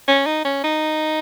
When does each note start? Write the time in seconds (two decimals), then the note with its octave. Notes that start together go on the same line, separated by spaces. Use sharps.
0.08 C#4
0.26 D#4
0.45 C#4
0.64 D#4